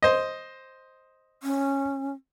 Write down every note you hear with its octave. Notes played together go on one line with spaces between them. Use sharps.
C5 D#5
C#4